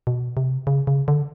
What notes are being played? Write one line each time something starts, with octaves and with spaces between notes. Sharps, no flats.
B2
C3
C#3
C#3
D3